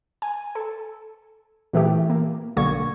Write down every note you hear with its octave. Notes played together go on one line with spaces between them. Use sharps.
G#5
A4
A#2 E3 A3 G4
A#3
B1 D3 A#3 C#6 G#6